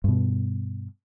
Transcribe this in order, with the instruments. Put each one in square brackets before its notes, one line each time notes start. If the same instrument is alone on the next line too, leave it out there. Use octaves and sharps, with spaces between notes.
[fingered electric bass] G2 B2